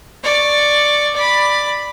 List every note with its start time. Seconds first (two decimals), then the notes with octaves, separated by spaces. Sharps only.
0.24 D5 C#6
1.15 D5 B5